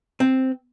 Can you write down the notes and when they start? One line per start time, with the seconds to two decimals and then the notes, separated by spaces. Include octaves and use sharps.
0.20 C4